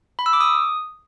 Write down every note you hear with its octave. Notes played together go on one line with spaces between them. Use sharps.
B5
E6
D6
D#6